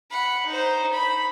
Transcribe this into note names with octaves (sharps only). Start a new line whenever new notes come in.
F#5 B5
D#4 C5
B5